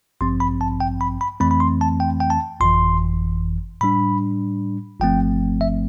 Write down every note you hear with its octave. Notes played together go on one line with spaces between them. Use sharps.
A1 G2 F3 C4 C6
B5
A5
G5
B5
B5
F2 E3 A3 C4 B5
B5
C6
A5
G5
G5
A5
G1 F2 E3 C6
A2 G3 D4 B5
G1 G2 F3 A3 C4 G5
E5